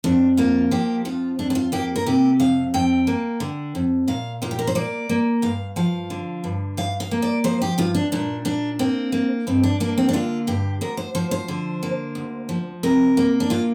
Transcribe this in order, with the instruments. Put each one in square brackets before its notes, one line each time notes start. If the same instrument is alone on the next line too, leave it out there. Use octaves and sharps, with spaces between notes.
[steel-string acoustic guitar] F2 D4
A#3 F4
F3 G4
F2 F4
F2 D4
D4
F4
A#3 G4
A#4
C3 G4
F2 F5
F2 G5
A#3
D3
F2
A#2 F5
A#2 F4
G4
A#4
C5
A#3 D5
A#3
G2 F5
F3 F5
D3
G2
G2 F5
F5
A#3
D5
F3 C5
G4
G2 F4
D4
A#2 D4
A#2 D4
A#3 C4
A#3
G2 C4
D4
A#3 D4
C4
D4
D3 F4
G2 G4
D2 A#4
C5
F3 C5
C5
D3
A#3
D2
F3
C3 A#4
A#3
D4
A#2 F4